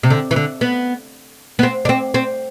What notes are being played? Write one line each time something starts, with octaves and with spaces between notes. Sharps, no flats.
C3
D3
E3
D3
B3
B3
C4
D4
C4
C4